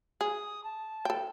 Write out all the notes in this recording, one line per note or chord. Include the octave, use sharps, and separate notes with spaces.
G#4 D#6
A5
A4 G5